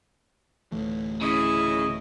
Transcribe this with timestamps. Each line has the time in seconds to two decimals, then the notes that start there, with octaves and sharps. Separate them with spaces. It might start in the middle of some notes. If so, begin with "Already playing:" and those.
0.72 D1 E3 A3
1.21 C#3 E4 D#5